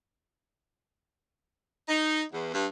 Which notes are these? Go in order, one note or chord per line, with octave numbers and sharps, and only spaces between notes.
D#4
E2
G2